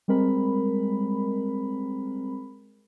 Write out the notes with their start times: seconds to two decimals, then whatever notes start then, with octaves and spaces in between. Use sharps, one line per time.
0.08 G3 G#3 C4 A#4 B5